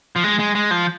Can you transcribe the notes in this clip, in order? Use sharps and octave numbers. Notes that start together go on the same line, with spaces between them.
F3
G#3
G#3
G#3
F3